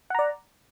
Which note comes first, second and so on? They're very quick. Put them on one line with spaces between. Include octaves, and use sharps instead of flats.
F#5 A#5 D5